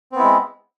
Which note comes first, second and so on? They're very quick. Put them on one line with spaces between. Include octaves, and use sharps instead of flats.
C4 B3 E4 G#3